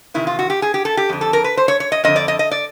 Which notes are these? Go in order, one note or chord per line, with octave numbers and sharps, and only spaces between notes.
E2 C3 D#3 E4
F4
F#4
G4
G#4
G4
A4
G4
F2 D3
A4
A#4
B4
C5
C#5
C#5
D#5
F2 D3 D#5
D5
D#5
D#5
D5